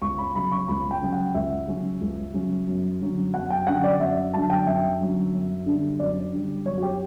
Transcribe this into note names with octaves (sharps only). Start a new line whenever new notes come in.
C#2 C#6
B5
C#3 F#3 C#4 B5
C#6
C#2 B5
G5
C#3 F#3 C#4
F#5
C#2 E5
C#3 F#3 C#4
C#2
C#3 F#3 C#4
F#2
D3 F#3 C#4
F#2 F#5
G5
D3 F#3 C#4 F#5
D5
F#2 E5
D3 F#3 C#4 A5
G5
F#2 E5
D3 F#3 C#4
F#2
D3 G3
F#2 D5
D3 G3
F#2 C#5
F#4
G4